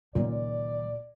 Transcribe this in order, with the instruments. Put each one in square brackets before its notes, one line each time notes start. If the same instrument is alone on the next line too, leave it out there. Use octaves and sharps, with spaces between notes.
[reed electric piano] C#2 A#2 [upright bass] D#3 F#3 [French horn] D5